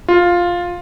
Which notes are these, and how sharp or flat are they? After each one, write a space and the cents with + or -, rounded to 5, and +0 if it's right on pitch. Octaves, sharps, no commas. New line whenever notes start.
F4 +5